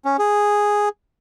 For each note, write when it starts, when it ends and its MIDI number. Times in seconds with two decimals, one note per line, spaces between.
0.05 0.17 61
0.19 0.89 68